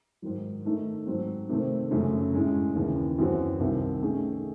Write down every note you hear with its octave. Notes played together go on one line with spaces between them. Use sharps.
G#2 D#3 F#3
D#3 A3 D#4
G#2 F#3 C4
C3 D#3 A3 C4
F#2 C#3 F#3 A3 C#4
A2 G#3 C#4
D#2 C#3 E3
F#2 E3 C4 F#4
C2 C3 D#3
D#3 A3 C#4 G#4